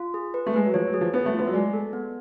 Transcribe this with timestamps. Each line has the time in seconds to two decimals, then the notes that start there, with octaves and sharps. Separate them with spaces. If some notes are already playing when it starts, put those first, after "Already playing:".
Already playing: F4
0.14 G#4
0.34 B4
0.47 A3
0.54 G#3 B4
0.65 F#3
0.74 F3 C#5
0.87 F#3
0.94 G#4
1.01 F3
1.13 B3 G#4
1.26 A3
1.34 B3 F4
1.47 F#3
1.53 G#3 D5
1.73 A4
1.93 B3